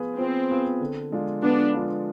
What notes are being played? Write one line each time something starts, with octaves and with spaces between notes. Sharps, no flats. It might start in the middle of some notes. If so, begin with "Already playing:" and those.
Already playing: F3 B3 F4 G#4 B4
F3 C4
B3 F4 G#4 B4
D3
F3 G#3 D4 F4
D3 B3 D4
F3 G#3 D4 F4